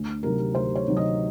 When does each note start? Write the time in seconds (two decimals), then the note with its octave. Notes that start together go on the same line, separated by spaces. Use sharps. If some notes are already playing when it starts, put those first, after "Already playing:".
Already playing: D2
0.23 C3 D#3 F#3 A#4
0.54 D2 C5
0.76 C#5
0.87 C3 D#3 F#3
0.97 D#5